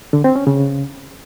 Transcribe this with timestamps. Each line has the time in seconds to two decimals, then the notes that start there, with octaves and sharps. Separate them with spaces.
0.13 D3
0.24 C4
0.36 C#4
0.47 C#3